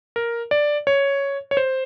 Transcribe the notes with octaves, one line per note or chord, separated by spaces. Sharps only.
A#4
D5
C#5
C#5
C5